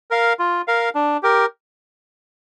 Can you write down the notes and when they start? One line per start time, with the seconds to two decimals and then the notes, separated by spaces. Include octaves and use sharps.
0.11 A#4 F5
0.39 F4
0.68 A#4 F5
0.95 D4
1.23 G4 A#4